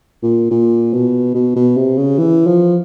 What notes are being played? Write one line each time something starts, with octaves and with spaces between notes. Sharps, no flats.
A#2
A#2
B2
B2
B2
C3
C#3
E3
F3